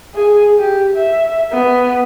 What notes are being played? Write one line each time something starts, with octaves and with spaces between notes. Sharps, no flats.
G#4
G4
E5
B3